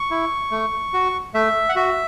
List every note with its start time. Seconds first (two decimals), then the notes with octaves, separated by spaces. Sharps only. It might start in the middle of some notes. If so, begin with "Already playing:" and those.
Already playing: C#6
0.11 E4
0.51 A3
0.94 F#4
1.34 A3 E5
1.69 F#5
1.76 F#4 E5